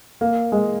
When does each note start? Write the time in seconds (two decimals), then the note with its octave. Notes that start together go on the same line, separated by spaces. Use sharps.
0.21 A#3
0.52 G#3